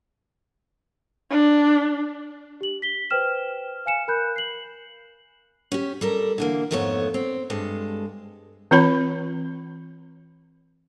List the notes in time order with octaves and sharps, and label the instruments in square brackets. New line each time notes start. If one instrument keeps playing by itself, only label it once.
[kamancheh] D4
[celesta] G4 F#7
B6 G7
B4 C5 G5 F6 E7
F5 G#5 C#7 E7
A#4 B5 F#6 G6
C7 F#7
[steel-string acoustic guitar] C#4 G4
G3 A4 A#4
D3 E3 A#3
F2 G#2 A3 B3 G#4 C#5
C4
G2 G#3 A4
[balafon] E3 C4 F4 C#5 B5